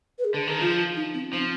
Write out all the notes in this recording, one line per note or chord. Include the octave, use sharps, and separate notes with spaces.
B4
G#4
D3
D#3
F3 F4
D#4
C4
F3 C4